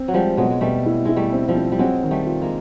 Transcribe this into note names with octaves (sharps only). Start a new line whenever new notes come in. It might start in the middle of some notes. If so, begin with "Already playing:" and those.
Already playing: C4
F#3
F3 G3 G#3
B2 F#3 G#3
G#3
B2 G3 A3
E4
G#3 E4
G3 A3
C4
F3 G3
C4
G3
F#3 G#3 C4
D#3
G3 A3
F4
G#3 A#3